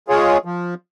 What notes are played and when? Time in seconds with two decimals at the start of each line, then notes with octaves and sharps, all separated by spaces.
0.08 G#3 F4 G#4 C#5
0.45 F3